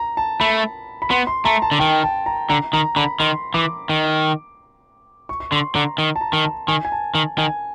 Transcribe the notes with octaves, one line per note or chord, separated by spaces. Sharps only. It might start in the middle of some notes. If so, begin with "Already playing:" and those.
Already playing: A#5
A5
A3 B5
B5
B3 C6
C6
A3 A#5
A5
D3
D#3 G5
A5
A#5
D3 A#5
D#3 A#5
D3 B5
D#3 C6
E3 D6
D#3
C#6
C#6
D3 C6
D3 A#5
D#3
A5
A#5
D#3
A5
D#3 G#5
G#5
A5
D#3
D#3 G#5